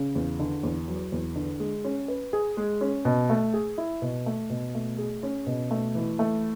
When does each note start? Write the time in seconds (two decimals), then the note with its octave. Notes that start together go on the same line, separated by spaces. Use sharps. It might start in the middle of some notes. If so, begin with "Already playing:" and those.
Already playing: C#3
0.16 E2
0.39 D3
0.63 E2
0.88 F#3
1.12 E2
1.35 D3
1.60 G#3
1.84 C#4
2.08 B4
2.33 G#4
2.57 G#3
2.81 C#4
3.05 B2
3.30 A3
3.54 G#4
3.78 E4
4.02 B2
4.26 A3
4.50 B2
4.75 A3
4.98 G#4
5.23 C#4
5.47 B2
5.71 A3
5.95 E3
6.19 A3